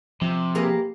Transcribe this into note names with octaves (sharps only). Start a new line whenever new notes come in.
C3 F3
A#3 G4 G#4 B4